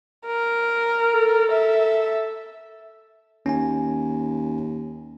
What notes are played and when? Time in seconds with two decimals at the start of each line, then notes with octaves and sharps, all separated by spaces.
0.26 A#4
1.14 A4
1.51 E5
3.46 D#2 C#4 G#5